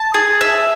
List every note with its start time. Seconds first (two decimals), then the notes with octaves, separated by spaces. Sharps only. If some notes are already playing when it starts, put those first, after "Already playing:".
Already playing: A5
0.14 G#4
0.41 E5